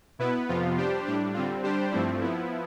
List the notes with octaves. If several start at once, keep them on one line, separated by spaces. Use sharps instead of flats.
B2 B3 E4 B4
F2 C3 F3 B3 F4
G3 D4 G4 C5
A2 G3 D4 G4
D3 G3 C4 F4
G3 D4 G4 C5
G2 F3 A3 C4 E4
F3 B3 E4